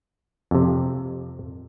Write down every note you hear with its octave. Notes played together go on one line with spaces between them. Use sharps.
F2 C3